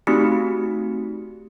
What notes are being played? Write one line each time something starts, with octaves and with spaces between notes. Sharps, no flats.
A3 C4 D#4 F#4 G4 C#7